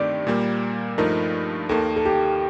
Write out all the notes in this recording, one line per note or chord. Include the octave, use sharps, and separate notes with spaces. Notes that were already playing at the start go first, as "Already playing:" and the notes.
Already playing: G2 D#3 A3 C4 G4 D5
A#2 G3 A#3
G2 F3 A3 D#4 A#4
D#2 D#3 A#3 A4
A4
G4